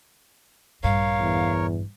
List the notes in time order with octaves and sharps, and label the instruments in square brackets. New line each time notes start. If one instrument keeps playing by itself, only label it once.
[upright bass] A#1 G2 [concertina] A#4 C#5 [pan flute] F5
[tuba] E2